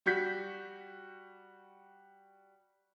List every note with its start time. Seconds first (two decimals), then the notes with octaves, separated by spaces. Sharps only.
0.06 G3 F#4 G6 B6